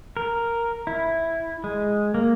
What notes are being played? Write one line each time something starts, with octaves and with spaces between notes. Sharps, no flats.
A#4
E4
G#3
A#3